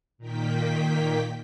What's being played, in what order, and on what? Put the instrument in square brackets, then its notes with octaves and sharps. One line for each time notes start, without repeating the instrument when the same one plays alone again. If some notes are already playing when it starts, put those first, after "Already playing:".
[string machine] A#2 D#3 A#3 G5 B6